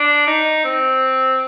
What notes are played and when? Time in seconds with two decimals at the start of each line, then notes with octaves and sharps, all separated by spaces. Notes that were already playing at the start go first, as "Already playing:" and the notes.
Already playing: D4
0.27 D#4
0.65 C4